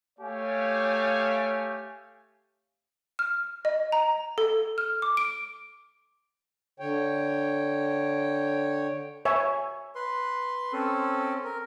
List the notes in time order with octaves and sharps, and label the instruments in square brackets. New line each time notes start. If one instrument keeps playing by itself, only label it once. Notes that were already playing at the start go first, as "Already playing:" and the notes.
[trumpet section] A3 G4 C#5 F5 G#5
[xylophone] F6
D#5
A#5
A4
F6
D6
D7
[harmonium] D3 C#5 G5
[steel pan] C#5 E5 G#5
[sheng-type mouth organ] B4 C6
C4 C#4 A4
A#4